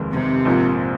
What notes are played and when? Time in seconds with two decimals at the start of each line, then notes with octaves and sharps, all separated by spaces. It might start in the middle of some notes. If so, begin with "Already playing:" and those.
Already playing: F1 D#2 D#3 G#3
0.12 C3
0.45 A#1 G#2 F3 A#3